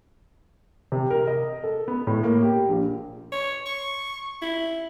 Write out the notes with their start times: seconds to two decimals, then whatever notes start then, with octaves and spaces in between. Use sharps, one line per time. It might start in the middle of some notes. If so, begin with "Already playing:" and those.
0.92 C3
1.11 A#4
1.27 D#5
1.64 A4
1.88 B3
2.07 A2
2.24 A#3
2.42 G4
2.69 A#1
3.32 C#5
3.66 C#6
4.42 E4